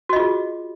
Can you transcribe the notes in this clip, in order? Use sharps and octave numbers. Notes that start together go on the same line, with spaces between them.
F4 F#4 G#4 D#5